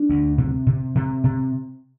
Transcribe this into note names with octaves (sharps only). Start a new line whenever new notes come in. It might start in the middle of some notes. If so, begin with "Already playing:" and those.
Already playing: D4
D2
C3
C3
C3
C3